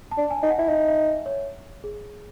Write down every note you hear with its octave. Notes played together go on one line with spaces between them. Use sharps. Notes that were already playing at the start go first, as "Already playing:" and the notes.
A5
D4
G#5
D#4
F#5
E4
D#4 E5
E5
C#5
G#4